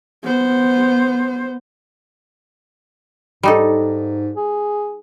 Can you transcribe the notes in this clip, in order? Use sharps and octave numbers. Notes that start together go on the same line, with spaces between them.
B3 C5
G#2 G3 D#4 A4
G#4